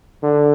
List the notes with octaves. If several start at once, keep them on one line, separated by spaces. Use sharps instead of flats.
D3